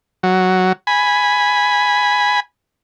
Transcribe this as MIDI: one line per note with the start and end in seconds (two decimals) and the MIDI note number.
0.23 0.73 54
0.87 2.40 80
0.87 2.40 83